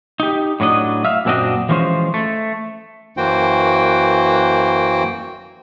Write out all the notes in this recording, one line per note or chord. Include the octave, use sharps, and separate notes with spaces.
D#4 G4
A2 F#3 D4 D#5
E5 F5
F#2 A#2 C4 D4 F#4 D#5
E3 F3 G#3 C#4 C5
A3
F#2 E3 A#3 F#4 C5 G5